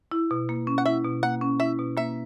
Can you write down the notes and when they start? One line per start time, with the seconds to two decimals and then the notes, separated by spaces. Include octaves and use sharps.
0.12 E4
0.31 B2
0.49 A#3
0.67 C#4
0.78 F#5
0.86 E4 E5
1.05 B2
1.23 A#3 F#5
1.41 C#4
1.60 E4 E5
1.79 B2
1.97 A#3 E5